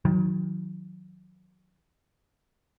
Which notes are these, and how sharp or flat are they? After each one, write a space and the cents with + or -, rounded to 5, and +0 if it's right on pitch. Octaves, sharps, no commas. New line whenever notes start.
D#3 +25 F#3 -15